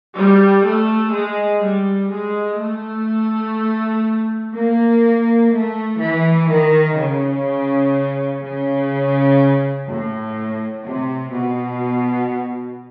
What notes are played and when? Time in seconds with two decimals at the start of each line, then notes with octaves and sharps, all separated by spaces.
0.17 G3
0.65 A3
1.14 G#3
1.63 G3
2.11 G#3
2.60 A3
4.53 A#3
5.51 A3
5.99 E3
6.47 D#3
6.96 C#3
8.41 C#3
9.87 A2
10.83 C3
11.32 B2